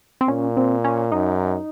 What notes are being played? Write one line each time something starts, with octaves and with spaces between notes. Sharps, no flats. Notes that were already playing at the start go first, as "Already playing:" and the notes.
C4
A#2 C#4
C4
C#4
F#2 D#4